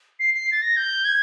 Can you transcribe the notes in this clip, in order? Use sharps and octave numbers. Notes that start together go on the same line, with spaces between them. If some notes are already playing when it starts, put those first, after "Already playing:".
C7
C7
A6
A#6
G6
G#6